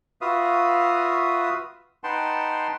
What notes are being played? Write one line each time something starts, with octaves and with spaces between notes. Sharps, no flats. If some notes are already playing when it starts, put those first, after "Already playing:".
F4 F#4 B4 E5 F5 D#6
D#4 B4 F#5 G5 A5 C6